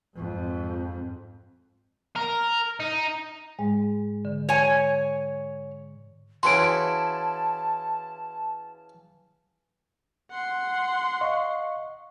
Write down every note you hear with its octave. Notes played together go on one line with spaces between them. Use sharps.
F2 G#2
A#4
D#4
G#2 G#3
D3
C#5 G#5
C#3 E3 F#4 A5 C6 D7
F#5 C6
D#5 F5 C#6